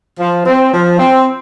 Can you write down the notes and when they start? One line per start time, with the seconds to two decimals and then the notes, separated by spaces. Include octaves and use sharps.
0.19 F3
0.46 C4
0.73 F3
0.99 C4